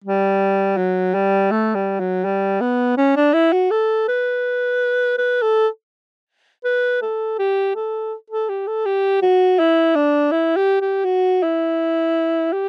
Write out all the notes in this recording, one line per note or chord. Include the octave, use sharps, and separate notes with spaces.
G3
F#3
G3
A3
G3
F#3
G3
B3
C#4
D4
E4
F#4
A4
B4
B4
A4
B4
A4
G4
A4
A4
G4
A4
G4
F#4
E4
D4
E4
G4
G4
F#4
E4
G4